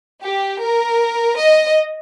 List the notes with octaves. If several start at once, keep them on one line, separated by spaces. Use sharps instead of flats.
G4
A#4
D#5